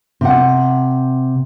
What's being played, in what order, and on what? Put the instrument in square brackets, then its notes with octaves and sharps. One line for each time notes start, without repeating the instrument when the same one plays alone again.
[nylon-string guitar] C3 F#5